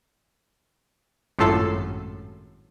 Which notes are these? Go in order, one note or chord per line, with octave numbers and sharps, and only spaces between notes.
G#1 F#2 A2 F4 A4 C7